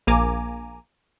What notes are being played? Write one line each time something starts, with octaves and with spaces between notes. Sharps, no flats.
A#1 A#3 G#5 A#5 D6